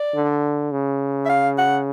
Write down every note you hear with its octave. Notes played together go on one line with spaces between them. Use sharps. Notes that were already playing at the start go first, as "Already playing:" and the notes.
Already playing: D5
D3
C#3
E5
F5
F#5